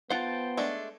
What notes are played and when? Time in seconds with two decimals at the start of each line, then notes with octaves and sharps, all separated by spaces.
0.10 B3 F4 C5 F#5 G5 A5
0.57 G#3 A3 D4